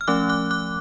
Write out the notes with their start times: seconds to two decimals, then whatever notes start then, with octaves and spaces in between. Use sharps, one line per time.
0.01 F6
0.08 F3 A3 C#4 D6 F#6
0.29 D6 F#6
0.51 D6 F#6